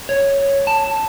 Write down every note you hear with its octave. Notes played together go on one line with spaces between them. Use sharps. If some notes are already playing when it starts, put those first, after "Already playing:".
C#5
A5